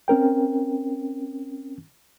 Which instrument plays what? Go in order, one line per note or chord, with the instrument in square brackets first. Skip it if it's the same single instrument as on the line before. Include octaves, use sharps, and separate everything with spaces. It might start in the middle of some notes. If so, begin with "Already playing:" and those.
[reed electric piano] C4 C#4 A#4 G5